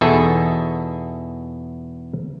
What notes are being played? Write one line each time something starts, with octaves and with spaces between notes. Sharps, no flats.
E2 B2 D#4 G#4 A4 E5